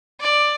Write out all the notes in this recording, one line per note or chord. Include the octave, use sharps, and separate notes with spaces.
D5